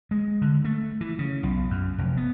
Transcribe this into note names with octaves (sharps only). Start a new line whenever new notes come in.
G#3
D3
A3
E3
C#3
B1
F#2
F1
B3